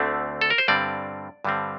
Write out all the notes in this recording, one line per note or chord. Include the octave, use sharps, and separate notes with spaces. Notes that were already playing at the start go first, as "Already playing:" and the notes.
Already playing: D2 D3 A3 C4
A4
A#4
C5
G2 D3 G3 C4 D5
G2 D3 G3 C4